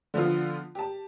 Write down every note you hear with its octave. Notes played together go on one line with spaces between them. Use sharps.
D3 F3 B3 F4
G4 A5